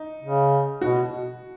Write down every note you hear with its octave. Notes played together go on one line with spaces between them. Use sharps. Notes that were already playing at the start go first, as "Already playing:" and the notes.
Already playing: D#4
C#3
B2 F#4